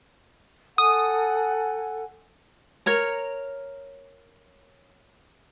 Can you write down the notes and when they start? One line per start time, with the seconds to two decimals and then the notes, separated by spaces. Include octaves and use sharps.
0.78 A4 F#5 G#5 D#6
2.86 A#4 C#5 A#5